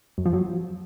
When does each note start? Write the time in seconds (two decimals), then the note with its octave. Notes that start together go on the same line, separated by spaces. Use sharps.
0.18 F#2
0.26 F3
0.33 F#3